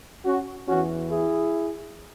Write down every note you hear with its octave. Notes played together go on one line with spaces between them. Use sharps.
C#4 F#4
E2 E3 C#4 F#4
E4 G#4